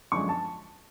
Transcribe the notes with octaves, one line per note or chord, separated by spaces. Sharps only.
F#2 D3 F3 G#3 C#6
A5